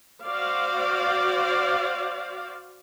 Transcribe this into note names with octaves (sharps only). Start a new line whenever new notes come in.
F#4 C5 D5 F5